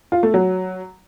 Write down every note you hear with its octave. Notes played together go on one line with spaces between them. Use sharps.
F4
A3
F#3